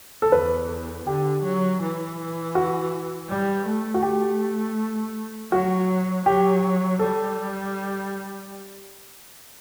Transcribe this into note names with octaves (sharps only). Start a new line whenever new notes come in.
A4
E2 B4
D3 G4
F#3
E3
F#4
G3
A3
F#4
G4
F#3 F#4
F#3 G4
G3 A4